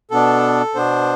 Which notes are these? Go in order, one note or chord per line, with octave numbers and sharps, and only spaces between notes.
B2 B3 D4 A4
B2 B3 D4 C5